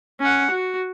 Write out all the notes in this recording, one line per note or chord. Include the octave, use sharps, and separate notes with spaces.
C#4 F#5
F#4